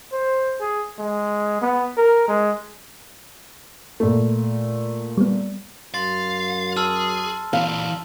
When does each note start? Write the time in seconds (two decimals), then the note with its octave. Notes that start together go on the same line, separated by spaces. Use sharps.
0.12 C5
0.60 G#4
0.99 G#3
1.62 B3
1.97 A#4
2.28 G#3
4.00 A#2 A3
5.17 G3 B3
5.94 F#2 F5 C6 A6
6.77 G#4 A5 E6 F6
7.53 A#2 E3 F5